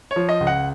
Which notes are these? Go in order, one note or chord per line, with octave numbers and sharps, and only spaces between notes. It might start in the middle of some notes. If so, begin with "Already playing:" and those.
C#5
F3
D#5
C#2
F#5